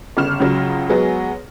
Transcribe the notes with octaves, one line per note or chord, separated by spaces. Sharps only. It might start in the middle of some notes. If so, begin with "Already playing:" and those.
G1 C#3 F6 E7
C#2 C#3 F#3
F#3 G#3 B3 G#4